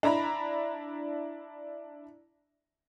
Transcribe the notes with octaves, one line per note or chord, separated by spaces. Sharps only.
D4 E4 A#5 B5